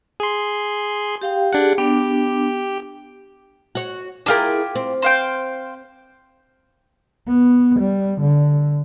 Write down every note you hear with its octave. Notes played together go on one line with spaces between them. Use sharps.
G#4 C6
G4 F5 G5
D4 G4 G#4 F#5
B3 D4 G4
F#4 C#5
D4 E4 F4 G4 G#4 A#4
C4
C5 F5 G5
B3
G3
D3